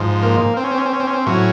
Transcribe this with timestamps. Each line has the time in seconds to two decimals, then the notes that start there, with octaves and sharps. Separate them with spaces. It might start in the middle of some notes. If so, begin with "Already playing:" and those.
Already playing: G#2 F3
0.23 A#3
0.57 C4
0.64 C#4
0.71 C4
0.78 C#4
0.85 C4
0.93 C#4
1.00 C4
1.07 C#4
1.13 C4
1.26 A2 F#3 C#4